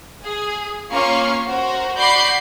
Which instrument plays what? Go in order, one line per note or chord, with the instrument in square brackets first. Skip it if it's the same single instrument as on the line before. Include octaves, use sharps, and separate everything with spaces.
[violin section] G#4
A#3 C#4 F4 C#6 C7
F#4 A#4 C5
F#4 D5 B5 D6 G6 C7